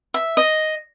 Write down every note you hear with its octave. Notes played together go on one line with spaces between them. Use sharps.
E5
D#5